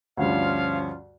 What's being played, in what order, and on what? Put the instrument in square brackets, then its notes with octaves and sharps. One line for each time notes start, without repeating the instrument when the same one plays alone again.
[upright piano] D2 G2 [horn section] F3 C#4 F4 [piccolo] F5